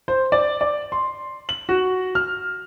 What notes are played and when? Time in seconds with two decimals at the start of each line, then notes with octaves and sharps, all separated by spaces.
0.08 C5
0.32 D5
0.61 D5
0.92 C6
1.49 F#7
1.69 F#4
2.15 F6